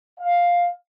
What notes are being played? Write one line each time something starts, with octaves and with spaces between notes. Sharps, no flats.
F5